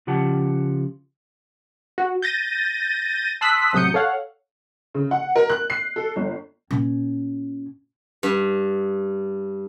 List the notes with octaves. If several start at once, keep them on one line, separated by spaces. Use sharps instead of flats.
C#3 F3 G4 F#5 A5
F#4
G6 A6 A#6 D#7
A5 C6 D#6 E6 F#6 B6
A1 C3 F#3 D#6 G6 C#7
A4 C#5 F5 F#5
C#3
F#5
A#4
F#6
C7
A4
G1
A#2 C#4
G2